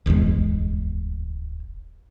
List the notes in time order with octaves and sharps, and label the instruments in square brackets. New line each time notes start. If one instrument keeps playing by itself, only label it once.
[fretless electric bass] D1 G1 E2 G#3